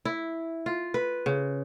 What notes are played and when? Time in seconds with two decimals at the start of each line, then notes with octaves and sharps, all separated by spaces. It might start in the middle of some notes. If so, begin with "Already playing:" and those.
0.05 E4
0.66 F4
0.94 B4
1.26 C#3